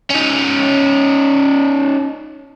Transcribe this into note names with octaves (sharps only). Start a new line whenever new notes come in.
C#4 D#4